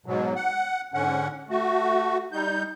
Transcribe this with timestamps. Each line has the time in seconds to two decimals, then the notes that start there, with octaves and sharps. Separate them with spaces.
0.06 G#2 B2 F#3
0.36 F#5
0.94 G#2 D3 C#4 F#5
1.49 A3 F#4
2.33 G3 D#4 G6